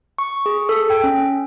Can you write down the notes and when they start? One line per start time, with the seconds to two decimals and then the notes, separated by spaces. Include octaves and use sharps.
0.18 C#6
0.46 G#4
0.69 A4
0.90 G5
1.04 C#4